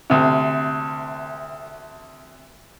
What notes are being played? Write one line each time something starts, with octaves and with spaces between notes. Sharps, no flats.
D2 C3